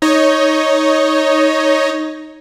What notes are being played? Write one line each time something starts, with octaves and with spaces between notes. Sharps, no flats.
D#4 C#5 D#5